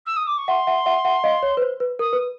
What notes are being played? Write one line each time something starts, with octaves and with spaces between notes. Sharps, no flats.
E6
D#6
D6
C#6
E5 F#5 C6
E5 F#5
E5 F#5
E5 F#5
D#5 F5
C#5
B4
C5
B4
A#4 D#6
B4